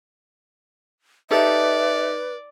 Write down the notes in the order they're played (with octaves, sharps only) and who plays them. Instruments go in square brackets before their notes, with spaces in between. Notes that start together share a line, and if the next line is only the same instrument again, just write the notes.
[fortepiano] D#4 G4 A4 [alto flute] B4 [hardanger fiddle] D5 [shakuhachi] E5